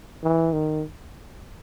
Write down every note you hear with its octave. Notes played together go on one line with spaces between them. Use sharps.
E3
D#3